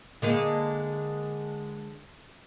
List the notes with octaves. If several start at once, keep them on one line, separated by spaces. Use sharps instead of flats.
D3 G#3 A#3